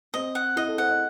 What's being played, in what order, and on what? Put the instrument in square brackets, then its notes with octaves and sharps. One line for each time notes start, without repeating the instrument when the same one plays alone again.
[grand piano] C4 [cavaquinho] D#5
[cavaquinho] F#5
[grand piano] E4 [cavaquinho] D#5
[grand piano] A4
[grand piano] C5 [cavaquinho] F#5
[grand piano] D#5